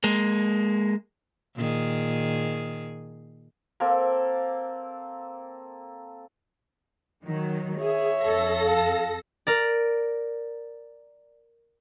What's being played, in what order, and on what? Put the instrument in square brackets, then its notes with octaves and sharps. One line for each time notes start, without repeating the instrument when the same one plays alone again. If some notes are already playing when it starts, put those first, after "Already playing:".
[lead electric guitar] G#3 A#3
[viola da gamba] A#2 D#3 G#4
[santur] A#3 C4 A4
[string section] D#3 F#3
[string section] G#4 [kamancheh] C#5 E5
[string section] F2 A4 A#6
[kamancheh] F5 A5
[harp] A#4 D5